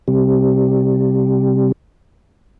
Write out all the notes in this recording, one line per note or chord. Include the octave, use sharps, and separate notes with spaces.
C3 G3